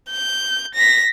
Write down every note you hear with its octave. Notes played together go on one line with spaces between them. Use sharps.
G6
A#6 B6